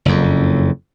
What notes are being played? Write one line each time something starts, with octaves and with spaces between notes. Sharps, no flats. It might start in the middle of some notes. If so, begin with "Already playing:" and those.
F#1 F2